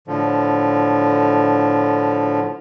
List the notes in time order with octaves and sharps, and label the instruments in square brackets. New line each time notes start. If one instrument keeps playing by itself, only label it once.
[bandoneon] A2 D3 F3